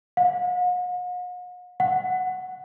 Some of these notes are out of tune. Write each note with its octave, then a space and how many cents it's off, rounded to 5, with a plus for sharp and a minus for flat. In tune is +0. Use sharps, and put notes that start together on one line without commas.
F#5 -45
F#5 +0